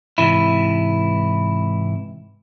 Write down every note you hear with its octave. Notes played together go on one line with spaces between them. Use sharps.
G#2 C3 E3 E4